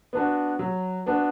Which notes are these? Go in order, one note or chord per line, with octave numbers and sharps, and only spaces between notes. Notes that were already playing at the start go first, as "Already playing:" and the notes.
B3 D4 F#4
F#3
B3 D4 F#4